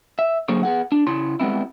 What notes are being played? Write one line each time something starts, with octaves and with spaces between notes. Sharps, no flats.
E5
D3 F#3 A#3 G#4 C5 C#5
B3 G#4 F#5
D4
C#3 E4 C#5 C6
G3 G#3 B3 C4 E4